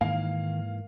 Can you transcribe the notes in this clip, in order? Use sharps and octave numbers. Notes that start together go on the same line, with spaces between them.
G#2 D#3 E3 A#3 F5